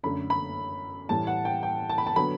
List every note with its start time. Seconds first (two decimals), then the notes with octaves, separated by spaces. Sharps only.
0.03 F#2 D3 A3 B5
0.30 B5
1.09 A2 E3 G3 A5
1.27 F#5
1.45 G5
1.63 G5
1.89 A5
1.98 B5
2.07 A5
2.16 D3 F#3 B3 B5